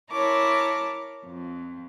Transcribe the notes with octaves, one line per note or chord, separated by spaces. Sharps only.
E4 A#4 C#5 A5 D6
F2